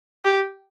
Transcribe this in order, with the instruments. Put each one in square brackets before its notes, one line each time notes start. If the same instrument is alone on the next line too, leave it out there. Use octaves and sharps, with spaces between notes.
[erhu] G4